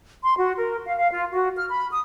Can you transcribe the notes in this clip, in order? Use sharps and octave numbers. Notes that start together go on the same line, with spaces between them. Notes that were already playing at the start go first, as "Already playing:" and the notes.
C6
F#4
A#4
F5
F5
F4
F#4
F6
B5
D#6